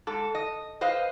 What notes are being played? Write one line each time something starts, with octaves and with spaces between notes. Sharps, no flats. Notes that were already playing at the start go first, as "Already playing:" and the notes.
G#2 A4
D#5
B4 C5 D#5 F5